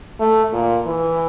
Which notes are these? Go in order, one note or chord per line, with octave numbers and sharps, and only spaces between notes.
A3
A#2
E3